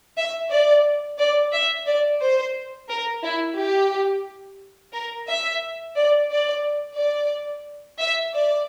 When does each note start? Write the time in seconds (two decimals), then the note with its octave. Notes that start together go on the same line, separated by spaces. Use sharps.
0.17 E5
0.50 D5
1.19 D5
1.53 E5
1.87 D5
2.21 C5
2.89 A#4
3.23 E4
3.56 G4
4.93 A#4
5.27 E5
5.96 D5
6.30 D5
6.98 D5
8.00 E5
8.34 D5